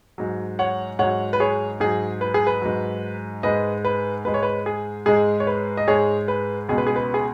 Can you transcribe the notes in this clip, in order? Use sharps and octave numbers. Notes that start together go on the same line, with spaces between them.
G#2 F#3
C#5 F#5
G#2 F#3 C#5 F#5
B4
G#4 C#5
G#2 F#3 G#4
B4
G#4
B4
G#2 F#3
G#2 G#3 B4 D#5
B4
G#2 G#3 B4
C#5
B4
G#4
G#2 G#3 G#4
C#5
B4
D#5
G#2 G#3 G#4 C#5
B4
C#2 B2 G#3 G#4
B4
G#4
B4
G#4